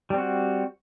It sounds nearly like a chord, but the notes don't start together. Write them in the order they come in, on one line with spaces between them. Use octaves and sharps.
G3 C4 F#4